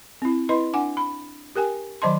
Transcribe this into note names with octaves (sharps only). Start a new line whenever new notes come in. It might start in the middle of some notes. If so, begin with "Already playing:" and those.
C4 E4
E4 B4 D#5 C6
D4 F#5 G#5 D6
B5
G4 A#4 G5 G#5
D#3 F#3 C5 D#5 A5 C6